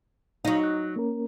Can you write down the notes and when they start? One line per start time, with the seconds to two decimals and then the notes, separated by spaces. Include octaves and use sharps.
0.45 F#3 D#4 F5 A#5
0.64 F#6
0.96 A#3 C#4 A#4